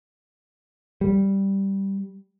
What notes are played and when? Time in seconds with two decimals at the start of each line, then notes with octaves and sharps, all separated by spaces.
1.01 G3